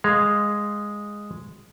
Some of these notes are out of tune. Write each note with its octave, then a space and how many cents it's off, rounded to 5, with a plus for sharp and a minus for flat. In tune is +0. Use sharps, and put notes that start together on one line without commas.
G#3 -5 F5 +0